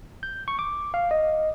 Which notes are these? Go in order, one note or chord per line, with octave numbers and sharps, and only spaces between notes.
G6
C#6
D6
F5
D#5